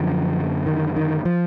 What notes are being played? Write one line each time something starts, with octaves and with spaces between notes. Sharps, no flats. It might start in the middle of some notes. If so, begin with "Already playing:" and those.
Already playing: F#2 D3 F3
D#3
D#3
F3